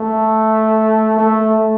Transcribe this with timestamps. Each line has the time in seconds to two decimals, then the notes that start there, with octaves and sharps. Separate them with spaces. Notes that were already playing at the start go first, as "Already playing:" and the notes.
Already playing: A3
1.19 A3